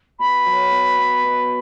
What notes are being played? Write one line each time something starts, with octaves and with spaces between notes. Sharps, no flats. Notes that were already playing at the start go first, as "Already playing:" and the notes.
B2 B5
F#3
B2
B3
B2